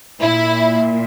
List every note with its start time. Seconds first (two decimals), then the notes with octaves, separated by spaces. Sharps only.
0.21 A#2 E4